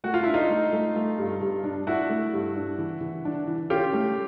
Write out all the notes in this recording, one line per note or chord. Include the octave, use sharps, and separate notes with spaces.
A3 F#4
F4
D4 E4
D#4 F4
A3
A3
A3
G2
G2
D4
D4 E4 F#4
A3
G2
D4
E3
E3
D4
E3
C#4 F4 G4
A3